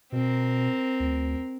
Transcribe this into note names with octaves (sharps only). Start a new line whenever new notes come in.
B2 C4 A#4
D2